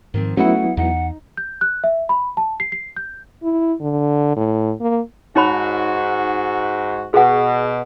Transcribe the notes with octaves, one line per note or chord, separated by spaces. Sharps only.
G#2 D#3 F3 C4
F#3 A3 B3 C#4 D#4 E4 F#4 F#5
E2 D#4 F#5
G6
F#6
E5
B5
A5
C7
C7
G6
E4
D3
A2
A#3
G#2 D#4 F#4 C#5 B5
B2 G#4 F#5